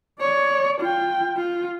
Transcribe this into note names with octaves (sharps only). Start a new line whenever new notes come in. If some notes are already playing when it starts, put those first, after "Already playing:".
C#5 D5
F4 G5
F4